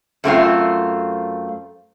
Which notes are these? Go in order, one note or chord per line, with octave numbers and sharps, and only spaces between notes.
F#2 A3 C4 F4